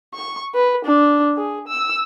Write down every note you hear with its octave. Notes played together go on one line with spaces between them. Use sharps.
C#6
B4
D4
G#4
E6